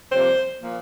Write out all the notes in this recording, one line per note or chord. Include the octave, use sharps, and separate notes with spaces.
F2 C3 G3 A#3 C5
A#2 F3 A#3